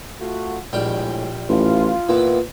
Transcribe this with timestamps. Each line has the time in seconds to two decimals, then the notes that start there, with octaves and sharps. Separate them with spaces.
0.20 A3 F4 F#4
0.73 A#1 A2 G3 G#3 G4
1.49 A1 F4
2.09 A#2 E3 B3